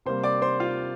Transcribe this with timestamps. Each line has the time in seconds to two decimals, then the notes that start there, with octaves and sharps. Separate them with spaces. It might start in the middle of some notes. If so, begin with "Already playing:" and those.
0.06 C3 G3 A#3 C5 C6
0.23 D5 D6
0.42 C5 C6
0.60 F4 F5